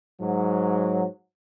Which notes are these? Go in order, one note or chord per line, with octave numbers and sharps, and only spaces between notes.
G#2 F#3